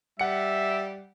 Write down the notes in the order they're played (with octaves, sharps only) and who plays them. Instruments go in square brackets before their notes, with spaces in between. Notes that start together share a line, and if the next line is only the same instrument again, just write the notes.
[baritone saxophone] G3 [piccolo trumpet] E5 [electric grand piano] F#5 C#7